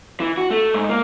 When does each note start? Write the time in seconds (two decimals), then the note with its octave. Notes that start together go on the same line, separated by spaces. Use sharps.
0.20 E3
0.37 F#4
0.51 A3
0.74 G#2
0.89 A#3